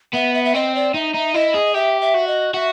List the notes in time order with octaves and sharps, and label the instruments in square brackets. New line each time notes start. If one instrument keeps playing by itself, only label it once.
[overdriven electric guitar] B3 [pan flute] E5
[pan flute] E5
E5
[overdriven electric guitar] C4 [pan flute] D#5
[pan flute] D5
[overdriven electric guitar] D#4 [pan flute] E5
[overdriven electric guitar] D#4
[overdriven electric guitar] E4 [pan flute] D#5
[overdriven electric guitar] G#4
[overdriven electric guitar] G4 [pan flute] E5
[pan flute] E5
[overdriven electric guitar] F#4
[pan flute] D#5
[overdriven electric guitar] F#4 [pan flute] E5